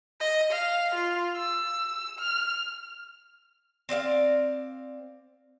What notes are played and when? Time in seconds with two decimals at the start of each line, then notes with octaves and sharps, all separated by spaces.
0.20 D#5
0.51 F5
0.95 F4
1.36 E6
2.19 F6
3.89 C4 D5 D#5 F5